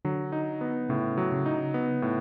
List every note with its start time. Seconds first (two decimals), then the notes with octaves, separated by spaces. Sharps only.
0.05 D3 F#3
0.32 D#4
0.61 B3
0.89 A2 C#3
1.18 F#3
1.32 C#3
1.46 D#4
1.74 B3
2.02 A2